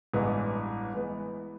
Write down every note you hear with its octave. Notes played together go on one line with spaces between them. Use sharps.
A1 G2 E3 G#3 B3
E3 G#3 B3